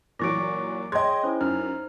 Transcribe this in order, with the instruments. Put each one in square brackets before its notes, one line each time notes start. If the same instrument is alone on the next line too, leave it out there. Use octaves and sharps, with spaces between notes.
[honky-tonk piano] A#2 E3 F#3 [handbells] C#6 A#6 [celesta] D6 A6 D7
[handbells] G#4 C#5 G5 [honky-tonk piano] D#5 G#6 [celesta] C6
[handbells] C#4 E4 [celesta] C5
[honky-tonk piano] F#2 [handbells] D#4 A#5 F6